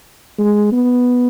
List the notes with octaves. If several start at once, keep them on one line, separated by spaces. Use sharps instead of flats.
G#3
B3